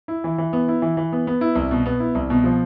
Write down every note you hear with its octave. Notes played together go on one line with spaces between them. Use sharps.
E4
E3
E3
B3
E4
E3
E3
B3
B3
E4
C2
B2
B3
E4
C2
B2
F3